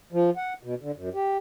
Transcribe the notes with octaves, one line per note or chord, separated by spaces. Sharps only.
F3
F#5
B2
D3
F#2
G4